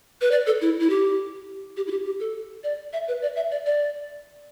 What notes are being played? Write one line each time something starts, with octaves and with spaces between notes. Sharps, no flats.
B4
D5
A4
E4
E4
G4
G4
E4
G4
G4
A4
D5
E5
B4
D5
E5
D5
D5